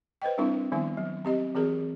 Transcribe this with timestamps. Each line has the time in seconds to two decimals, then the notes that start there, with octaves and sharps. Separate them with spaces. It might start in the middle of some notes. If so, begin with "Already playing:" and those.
0.22 B4 C5 D#5 G5
0.38 G3 C4 D4 E4 A#4
0.72 D#3 F3 G3 B3 E4
0.97 F#3
1.25 C4 G4 D#5
1.55 E3 C4 F#4 G#4 A#4